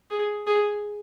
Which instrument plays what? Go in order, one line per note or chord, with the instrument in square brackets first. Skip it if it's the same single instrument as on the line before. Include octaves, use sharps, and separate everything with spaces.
[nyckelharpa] G#4
G#4